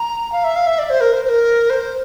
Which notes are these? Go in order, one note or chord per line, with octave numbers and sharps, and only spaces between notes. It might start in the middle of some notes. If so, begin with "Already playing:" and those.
Already playing: A#5
F5
E5
F5
E5
D5
C5
A#4
C5
C5
A#4
C5